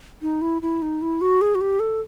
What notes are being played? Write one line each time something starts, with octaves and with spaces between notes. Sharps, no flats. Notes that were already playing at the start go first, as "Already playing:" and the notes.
D#4
E4
E4
D#4
E4
F#4
G#4
F#4
G4
A4